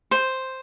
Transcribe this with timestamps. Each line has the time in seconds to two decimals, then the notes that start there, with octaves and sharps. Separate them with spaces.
0.11 C5